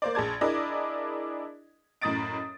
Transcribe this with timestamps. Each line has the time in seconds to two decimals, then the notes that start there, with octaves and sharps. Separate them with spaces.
0.02 A#3 C5 D5
0.15 A#1 G#4 A5 G#6
0.41 D4 E4 G#4 A#4 D5 D#5
2.01 F#2 A2 D#5 D#6 A6 D7